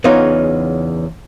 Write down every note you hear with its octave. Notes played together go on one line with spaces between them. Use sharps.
E2 C#3 B3 D#4 F4 C#5